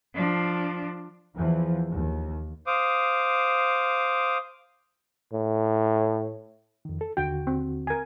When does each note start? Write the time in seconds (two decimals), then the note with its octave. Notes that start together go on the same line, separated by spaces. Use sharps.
0.15 F3 D4
1.37 E2 E3 F3
1.92 D#2
2.67 C5 F5 D6 D#6
5.33 A2
6.85 F2 D#3
7.01 A4
7.17 D#2 D3 F#4 G5
7.47 C4
7.87 A#4 G#5